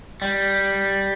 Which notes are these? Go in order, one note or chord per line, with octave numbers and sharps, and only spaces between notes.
G3